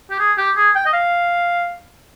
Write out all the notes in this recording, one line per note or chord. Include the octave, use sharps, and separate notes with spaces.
G4
G#4
G4
G#4
G5
D#5
F5